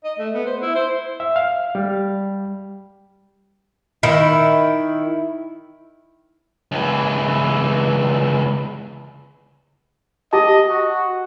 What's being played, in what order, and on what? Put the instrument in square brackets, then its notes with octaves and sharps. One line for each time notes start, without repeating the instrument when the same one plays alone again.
[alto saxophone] D#5
A3
B3
C5
E4
C5
[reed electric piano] E5
F5
G3
[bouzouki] D#3 E4
[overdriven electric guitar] C#2 E3
[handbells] G4 A5 [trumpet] D#5
[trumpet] F#4